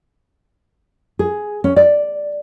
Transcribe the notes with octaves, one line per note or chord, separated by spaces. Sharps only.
G#4
C#4
D5